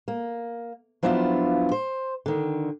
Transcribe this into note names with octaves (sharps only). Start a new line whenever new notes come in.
A#3
F3 F#3 B3 D4 E4 F4
C5
D3 D#3